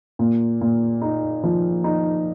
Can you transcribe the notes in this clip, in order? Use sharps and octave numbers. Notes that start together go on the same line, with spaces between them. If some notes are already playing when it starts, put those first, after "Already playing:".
A#2
A#2
D#4
F3
D#4